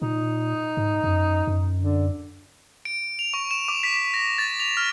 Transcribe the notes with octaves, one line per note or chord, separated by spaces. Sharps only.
A#2 D#4
G#2
F#2
F#2
D3
D7
F7
C#6
E7
D6
B6
B6
A#6
A6
F7
F6